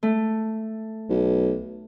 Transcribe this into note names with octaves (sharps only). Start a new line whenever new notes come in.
A3
B1